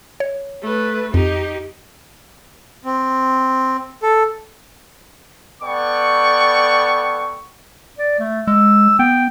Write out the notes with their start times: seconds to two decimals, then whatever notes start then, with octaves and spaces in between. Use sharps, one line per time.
0.20 C#5
0.62 A3 B4
1.14 F2 D#4 G4
2.85 C4
4.03 A4
5.62 B3 A4 D5 G5 C#6
7.98 D5
8.19 A3
8.47 G#3 E6
8.99 B3 G5